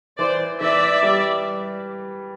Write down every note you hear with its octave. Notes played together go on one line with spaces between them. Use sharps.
E3 C5 D5
E3 D5 E5
G3